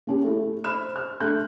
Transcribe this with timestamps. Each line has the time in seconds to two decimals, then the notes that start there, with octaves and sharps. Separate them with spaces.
0.07 A#3 C#4 G4
0.24 A3 E4
0.64 C5 B5 F6 E7
0.96 F6
1.20 A3 D4 F#6 G6